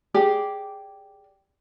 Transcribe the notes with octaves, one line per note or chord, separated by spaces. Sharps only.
G4 G#4 D5